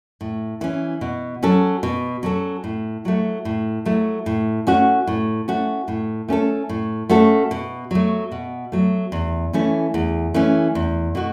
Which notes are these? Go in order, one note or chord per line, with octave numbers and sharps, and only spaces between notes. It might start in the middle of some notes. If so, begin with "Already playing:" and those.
A2
E3 C#4
B2
F#3 C#4 A4
B2
F#3 C#4 A4
A2
F#3 A3
A2
F#3 A3
A2
A3 C#4 F#4
A2
A3 C#4 F#4
A2
A3 C#4 F#4 A4
A2
A3 C#4 F#4 A4
B2
F#3 A3
B2
F#3 A3
E2
E3 A3 C#4
E2
E3 A3 C#4
E2
B2 A3 F#4